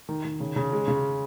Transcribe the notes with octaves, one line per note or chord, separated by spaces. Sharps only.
D#3
D#3
C#3
C#3
G#3
C#3